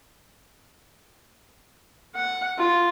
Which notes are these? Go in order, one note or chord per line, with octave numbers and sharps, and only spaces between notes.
F#5
F4